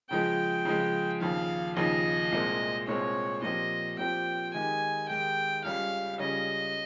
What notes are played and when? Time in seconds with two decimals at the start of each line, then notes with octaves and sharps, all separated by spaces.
0.10 C#3 F3 G#3 G5
0.65 C#3 F3 G#3
1.21 D#2 C#3 F3 F5
1.76 D#2 C#3 F3 D#5
2.32 C2 A#2 G#3 C4
2.88 C2 A#2 G#3 C4 C#5
3.42 A#2 F3 C4 G4 D#5
3.98 A#2 F3 C4 G4 G5
4.54 D#3 G#3 D#4 G4 G#5
5.09 D#3 G#3 D#4 G4 G5
5.64 C#2 C#3 G3 C#4 F5
6.20 C#2 C#3 G3 C#4 D#5